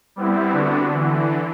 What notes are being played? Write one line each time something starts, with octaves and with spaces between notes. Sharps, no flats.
G3 B3 C4 E4
D3 B3 D4 F#4
D3 E3